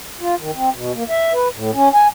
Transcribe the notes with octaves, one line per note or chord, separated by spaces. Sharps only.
F4
D#3
C4
B2
A#3
E5
B4
A2
C#4
G#5